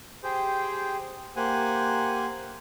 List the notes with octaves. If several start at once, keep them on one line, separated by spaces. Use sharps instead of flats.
G4 G#4 C5 G5
A#3 G4 C5 F#5 G#5